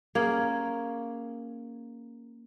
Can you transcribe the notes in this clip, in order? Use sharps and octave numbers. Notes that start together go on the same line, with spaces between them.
A#3 C#4 G#4